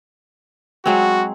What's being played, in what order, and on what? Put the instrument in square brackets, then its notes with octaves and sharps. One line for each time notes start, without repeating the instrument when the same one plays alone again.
[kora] F#3 G#3 C4 [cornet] F#4